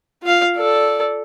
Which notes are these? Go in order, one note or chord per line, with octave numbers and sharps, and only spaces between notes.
F4 F5
A4 D5